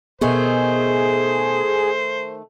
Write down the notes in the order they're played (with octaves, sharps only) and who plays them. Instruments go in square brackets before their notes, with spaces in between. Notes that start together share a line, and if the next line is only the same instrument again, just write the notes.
[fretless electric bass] B2 B3 [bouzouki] D#3 A3 [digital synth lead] G#4 [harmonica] C5